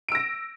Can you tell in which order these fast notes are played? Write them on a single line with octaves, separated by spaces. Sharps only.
D7 E6 A#6